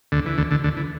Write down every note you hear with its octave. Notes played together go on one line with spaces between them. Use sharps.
D2 D3
E3
D2 D3
D2 D3
D2 D3
E3